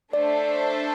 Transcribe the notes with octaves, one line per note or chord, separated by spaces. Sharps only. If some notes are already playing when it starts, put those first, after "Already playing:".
A3 D4 A4 C5 D5 E5